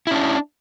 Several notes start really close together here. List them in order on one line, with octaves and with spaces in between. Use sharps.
E4 C#4 D4